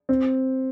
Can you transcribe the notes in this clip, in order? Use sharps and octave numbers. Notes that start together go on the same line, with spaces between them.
C4